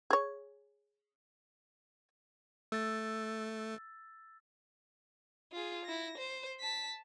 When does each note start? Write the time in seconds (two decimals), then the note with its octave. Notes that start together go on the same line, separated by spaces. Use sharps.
0.10 G#4 C#5
2.72 A3 E6 A6
5.52 F4 G#4
5.85 E4 A#6
6.17 C5
6.61 A5 B6